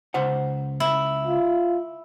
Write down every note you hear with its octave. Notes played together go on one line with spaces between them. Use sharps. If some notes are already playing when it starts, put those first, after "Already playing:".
C#2 C5 F#5
E4
F4